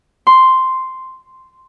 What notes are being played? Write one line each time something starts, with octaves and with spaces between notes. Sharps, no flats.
C6